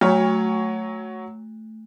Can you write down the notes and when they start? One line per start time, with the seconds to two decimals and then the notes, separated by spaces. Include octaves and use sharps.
0.01 F#3 A3 C#5